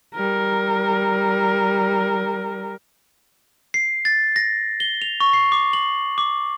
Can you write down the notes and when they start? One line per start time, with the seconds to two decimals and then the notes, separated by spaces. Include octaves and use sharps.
0.15 G3 A#4
3.74 C7
4.05 A6
4.36 A#6
4.80 G7
5.02 F7
5.20 C#6
5.33 C7
5.52 D6
5.73 F#7
6.18 D6